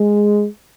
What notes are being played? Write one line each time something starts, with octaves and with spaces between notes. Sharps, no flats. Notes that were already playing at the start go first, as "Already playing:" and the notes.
Already playing: G#3